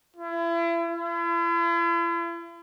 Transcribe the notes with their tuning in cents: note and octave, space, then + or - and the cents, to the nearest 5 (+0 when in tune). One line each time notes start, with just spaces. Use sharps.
E4 +35
E4 +45